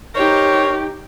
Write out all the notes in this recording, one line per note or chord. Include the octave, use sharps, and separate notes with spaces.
D#4 G4 A#4 C5 C#5